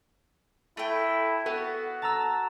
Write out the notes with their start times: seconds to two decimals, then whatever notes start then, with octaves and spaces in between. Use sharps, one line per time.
0.77 A3 E4 G5
1.46 B3 F#4 A4
2.02 A5 A#5 E6